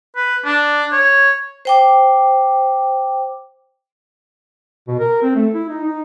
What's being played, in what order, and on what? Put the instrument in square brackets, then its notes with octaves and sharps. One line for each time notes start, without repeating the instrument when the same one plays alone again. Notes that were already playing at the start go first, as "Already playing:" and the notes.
[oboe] B4
D4
C#5
[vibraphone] C5 G5 D6
[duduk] B2
A#4
C4
A3
E4
D#4
D#4